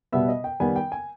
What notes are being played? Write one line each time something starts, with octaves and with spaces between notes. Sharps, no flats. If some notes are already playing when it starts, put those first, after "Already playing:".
B2 G3 B3 E5
D#5
G5
D#3 G3 B3 G#5
G5
G#5